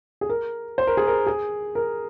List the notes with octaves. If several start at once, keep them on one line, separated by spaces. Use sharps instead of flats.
G#4
A#4
C5
A#4
G#4
A#4
G#4
A#4